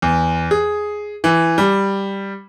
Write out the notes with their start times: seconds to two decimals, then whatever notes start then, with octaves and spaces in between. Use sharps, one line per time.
0.02 E2
0.51 G#4
1.24 E3
1.58 G3